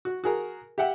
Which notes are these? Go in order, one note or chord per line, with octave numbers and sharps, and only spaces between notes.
F#4
F#4 G#4 A#4
G4 E5 F#5 G5